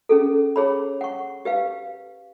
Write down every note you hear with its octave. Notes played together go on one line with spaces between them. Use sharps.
C#4 G#4 A4
G#4 C#5 B5
F#5 C#6
G4 B4 F5